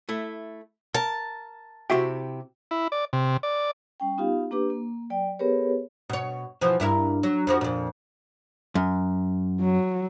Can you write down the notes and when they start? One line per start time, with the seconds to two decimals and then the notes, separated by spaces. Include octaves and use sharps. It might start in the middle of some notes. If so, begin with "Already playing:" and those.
0.09 A3 E4
0.95 A#4 A5
1.90 C3 E4 F#4 G4 E5 G5
2.71 E4
2.92 D5
3.13 C3
3.43 D5
4.00 G3 C#4 G5
4.18 B3 D#4 F4 G4 F5
4.51 A#3 D4 G4 B4 D6
4.70 A#3
5.10 F#3 D5 G5
5.39 B3 G4 G#4 A#4 B4 C#5
6.09 B2 C#5
6.61 B2 E3 F3
6.80 G2 E4 A#4
7.23 F#3
7.47 F2 F3 F#4
7.61 F2 A#2
8.75 F#2
9.61 F#3